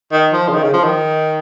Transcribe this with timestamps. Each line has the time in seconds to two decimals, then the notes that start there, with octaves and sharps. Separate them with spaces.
0.12 D#3
0.33 F3
0.48 C#3
0.53 D#3
0.63 C#3
0.73 F3
0.84 D#3